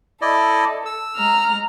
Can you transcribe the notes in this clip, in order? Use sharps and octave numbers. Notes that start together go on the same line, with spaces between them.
E4 A4 D5 D#5
E6
G#3 A#5 F6